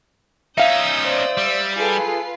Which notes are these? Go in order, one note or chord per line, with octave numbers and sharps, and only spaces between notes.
C#4 D#4 E5 F5 D#6 E6 G6
C5 D5
G3 E6
F4 G#4 A4 B4 C7